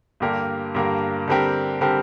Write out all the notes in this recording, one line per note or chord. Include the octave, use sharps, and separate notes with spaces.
G2 D3 A#3 G4 A#4
G2 D3 A#3 G4 A#4
D3 G3 C4 G4 A#4
D3 G3 C4 G4 A#4